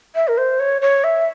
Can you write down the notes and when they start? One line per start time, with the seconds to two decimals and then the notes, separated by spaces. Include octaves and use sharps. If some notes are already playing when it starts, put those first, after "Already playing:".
0.15 E5
0.28 A#4
0.37 C5
0.59 C#5
0.82 C#5
1.04 E5